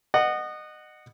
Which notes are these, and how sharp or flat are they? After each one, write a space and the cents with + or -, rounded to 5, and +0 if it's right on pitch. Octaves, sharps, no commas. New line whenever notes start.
D#5 -25 F#5 +0